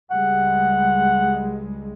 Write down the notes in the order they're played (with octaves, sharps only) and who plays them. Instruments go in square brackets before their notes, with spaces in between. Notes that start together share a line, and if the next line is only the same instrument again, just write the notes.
[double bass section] C#2 G3 G#3 [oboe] F#5